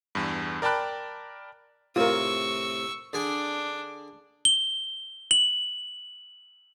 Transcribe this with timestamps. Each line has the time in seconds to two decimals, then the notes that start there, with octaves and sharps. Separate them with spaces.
0.15 E2 G2
0.62 A#4 D5 G5 A5 B5 F#6
1.96 A2 C3 F4 A#4 C#6 E6
3.13 D3 D4 G#4 G#5
4.45 G7
5.31 F#7